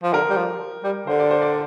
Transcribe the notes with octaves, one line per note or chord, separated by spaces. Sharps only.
F3
D3 A#4
G3
F3
G3
D3 C5
D5
C5
D5